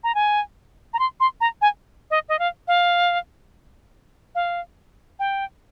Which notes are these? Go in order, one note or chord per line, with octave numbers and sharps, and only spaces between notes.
A#5
G#5
A#5
C6
C6
A#5
G#5
D#5
D#5
F5
F5
F5
G5